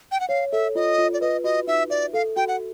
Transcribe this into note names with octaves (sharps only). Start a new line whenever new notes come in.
G5
F#5
C#5 F5
A4 E5
F4 D#5
F4
D5
B4 D#5
F#4 D#5
D#4 E5
D5 E5
A4 F5
F#4 G5
F#5